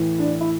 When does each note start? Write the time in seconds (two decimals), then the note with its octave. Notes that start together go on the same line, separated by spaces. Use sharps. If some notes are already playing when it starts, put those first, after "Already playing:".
Already playing: A2 E3
0.19 D4
0.41 E4